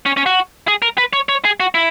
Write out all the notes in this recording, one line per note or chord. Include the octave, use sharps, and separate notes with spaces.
C#4
C#4
F#4
G#4
A#4
B4
C#5
C#5
G#4
F#4
E4